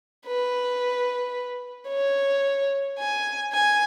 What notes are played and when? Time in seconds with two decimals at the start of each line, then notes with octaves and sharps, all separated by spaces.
0.26 B4
1.90 C#5
2.98 G#5
3.53 G#5